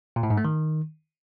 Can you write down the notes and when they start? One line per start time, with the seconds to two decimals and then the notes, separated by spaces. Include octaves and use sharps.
0.16 A#2
0.23 A2
0.30 G#2
0.37 A3
0.45 D#3